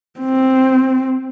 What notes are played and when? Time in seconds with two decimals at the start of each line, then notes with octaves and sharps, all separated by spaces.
0.20 C4